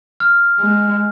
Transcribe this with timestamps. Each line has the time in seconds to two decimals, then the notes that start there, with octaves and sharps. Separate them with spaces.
0.20 F6
0.60 G#3